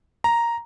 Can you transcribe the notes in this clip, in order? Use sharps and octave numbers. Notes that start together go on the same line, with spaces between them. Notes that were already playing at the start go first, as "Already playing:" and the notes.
A#5